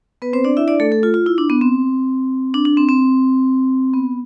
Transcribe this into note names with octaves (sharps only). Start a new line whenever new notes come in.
B3 B4
C4 C5
D4 D5
E4 E5
D4 D5
A3 A4
A3 A4
F4
F4
E4
D4
B3
C4
D4
D4
C4
C4
B3